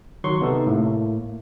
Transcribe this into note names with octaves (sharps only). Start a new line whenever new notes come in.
D#3 F#3 C6 C#6
C3 B3 D#4 A4
A2 A3 A#3